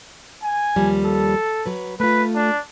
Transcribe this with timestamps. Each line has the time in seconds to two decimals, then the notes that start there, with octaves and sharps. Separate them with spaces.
0.43 G#5
0.76 D#2 F3 G3
1.05 A4
1.66 F#3 B4
2.00 A3 F4 B4
2.35 D4